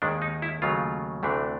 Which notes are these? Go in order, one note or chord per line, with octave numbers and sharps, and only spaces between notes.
D#2 D#3 G#3 D4
D#4
E4
D#2 C#3 F#3 A3 F4
D2 C3 E3 A3 D4